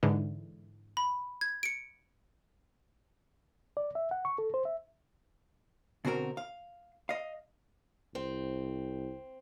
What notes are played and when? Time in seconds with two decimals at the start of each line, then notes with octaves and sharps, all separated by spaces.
0.03 G#2 D3 E3
0.97 B5
1.41 G#6
1.63 C#7 D7
3.77 D5
3.95 E5
4.11 F#5
4.25 C#6
4.38 A4
4.54 C5
4.65 E5
6.05 B2 D3 C4 F#4 A#4
6.37 F5
7.09 D#5 F5
8.15 C2 C4